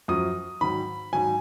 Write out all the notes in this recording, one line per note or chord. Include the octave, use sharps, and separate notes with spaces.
F#2 F3 D#6
G#2 D#3 F#3 B5
G#2 D#3 F#3 G#5